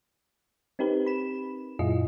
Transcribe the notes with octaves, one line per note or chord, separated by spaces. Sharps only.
C4 D#4 G4 A#4 B4
B5 E7
F#2 A#2 E4 F4 G#4 D#5